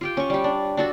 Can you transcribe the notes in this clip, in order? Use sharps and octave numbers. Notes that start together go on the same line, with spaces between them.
F4 G4 G5
C#4 C#6
G3 G4
D4
D4 F#4 A4